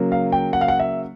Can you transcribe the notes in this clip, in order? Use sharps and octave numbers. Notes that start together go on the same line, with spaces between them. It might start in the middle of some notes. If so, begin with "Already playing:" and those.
Already playing: C#3 F#3 A#3
F5
G5
F#5
F5
F#5
E5